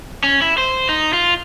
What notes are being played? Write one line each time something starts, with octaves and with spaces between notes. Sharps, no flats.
C#4
E4
C5
D#4
F4